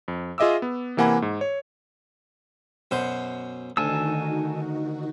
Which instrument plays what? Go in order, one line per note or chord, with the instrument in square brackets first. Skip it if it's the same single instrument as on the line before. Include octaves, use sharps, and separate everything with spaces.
[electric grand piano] F2
F4 G#4 D#5 E5 D6 E6
B3
C3 E3 A#3 F#5 G#5 B5
G#2
C#5
[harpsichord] F#2 B2 C5
[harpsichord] D2 [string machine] D#3 D#4 F#4 [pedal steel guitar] G#5 A5 E6